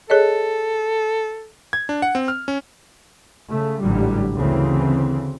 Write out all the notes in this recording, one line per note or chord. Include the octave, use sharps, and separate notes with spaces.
G#4 A4 C#5 D#5
G#6
D4
F#5
C4
F6
C#4
C#3 A3
A1 G#2 D3 F#3 G3
D2 C#3 E3 C4